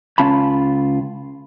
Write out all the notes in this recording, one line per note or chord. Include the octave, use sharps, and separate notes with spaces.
C#2 B3 C#4 F4 A5 B5